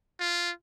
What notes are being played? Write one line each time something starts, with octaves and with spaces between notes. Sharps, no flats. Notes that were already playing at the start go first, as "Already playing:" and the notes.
F4